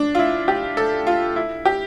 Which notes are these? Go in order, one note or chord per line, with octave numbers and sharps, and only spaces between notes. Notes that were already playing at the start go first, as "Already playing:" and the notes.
Already playing: D4
F4
E4
G4
A4
F4
E4
G4